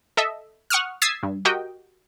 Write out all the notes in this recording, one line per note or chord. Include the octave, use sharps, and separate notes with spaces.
A4 D#5 E5
F#5 C#6 D#6 F6
D#6 E6 G#6 A6 B6 C7
G2
F#4 G4 A#4 D#5 G5